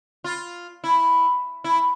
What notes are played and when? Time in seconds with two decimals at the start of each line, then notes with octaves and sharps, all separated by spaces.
0.24 F4
0.84 E4
1.64 E4